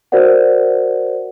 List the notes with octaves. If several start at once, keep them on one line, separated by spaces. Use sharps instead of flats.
F#4 A#4 C5 D5 F#5